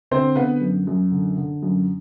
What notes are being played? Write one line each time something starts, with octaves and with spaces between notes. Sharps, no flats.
D3 C4 C5
D3 B3 B4
F#2
F#2
D3
D3
F#2